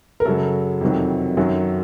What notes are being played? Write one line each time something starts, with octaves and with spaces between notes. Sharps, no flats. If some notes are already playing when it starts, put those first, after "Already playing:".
A#4
F#2 C#3 F#3 A4
F2 C3 D#3 F#3
F#2 D#3 F#3